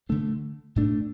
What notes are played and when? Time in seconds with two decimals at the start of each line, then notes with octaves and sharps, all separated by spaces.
0.09 D3 A3 D4
0.76 A2 A3 D4